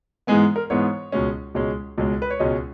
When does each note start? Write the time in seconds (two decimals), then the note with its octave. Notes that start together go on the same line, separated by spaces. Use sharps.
0.27 G#2 E3 G#3 B3 G#5
0.56 A#4
0.70 G#2 E3 G#3 B3 C#5
1.12 C#2 B2 G#3 C#4
1.55 C#2 B2 G#3 C#4
1.98 C#2 B2 G#3 C#4
2.22 B4
2.30 C#5
2.39 C#2 B2 G#3 C#4 D#5